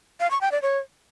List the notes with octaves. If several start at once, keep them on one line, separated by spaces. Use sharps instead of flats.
F5
C#6
G5
D5
C#5